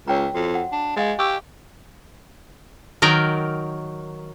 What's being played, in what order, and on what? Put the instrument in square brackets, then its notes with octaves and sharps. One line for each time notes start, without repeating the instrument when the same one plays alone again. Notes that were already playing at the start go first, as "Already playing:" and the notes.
[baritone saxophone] C#2 [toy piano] C#5 G5 A#5
[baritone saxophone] F2 [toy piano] F#4
[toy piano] F#5
[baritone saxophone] D4
[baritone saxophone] G#3 [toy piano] D#5 F5 G#5
[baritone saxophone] G4 [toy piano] C#6 D6 E6
[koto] D#3 F#3 A#4 G5